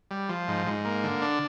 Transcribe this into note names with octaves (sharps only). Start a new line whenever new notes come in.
G3
F3
G#2
G#2
A#3
D3
D4